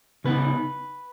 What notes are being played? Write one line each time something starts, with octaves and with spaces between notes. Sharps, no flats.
C#3 B3 D#4 B4